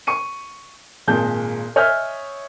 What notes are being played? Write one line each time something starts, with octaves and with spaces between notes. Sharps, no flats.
C#6 C#7 D#7
G#1 A#2 G#3 A5 G6
C#5 D#5 E5 G#5 F6 G6